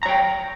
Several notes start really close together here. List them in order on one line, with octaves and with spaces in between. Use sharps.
A#5 C#5 G5